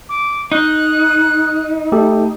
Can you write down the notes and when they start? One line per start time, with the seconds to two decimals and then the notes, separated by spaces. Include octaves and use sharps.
0.09 D6
0.52 D#4 F#6
1.92 A3 G4 A4